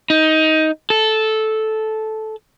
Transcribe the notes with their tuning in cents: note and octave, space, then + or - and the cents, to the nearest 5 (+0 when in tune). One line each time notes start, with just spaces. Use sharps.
D#4 +15
A4 -10